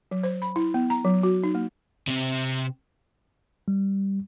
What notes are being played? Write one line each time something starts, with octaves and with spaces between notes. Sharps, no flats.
F#3
C5
B5
E4
B3
A#5
F#3
F#4
D#4
A#3
C3 C4
G3